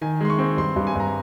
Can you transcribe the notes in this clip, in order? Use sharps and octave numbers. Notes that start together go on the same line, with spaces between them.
D#3 G#5
G#3 C6
C#6
C4
G2 C6
G2
G#5
G2 A#5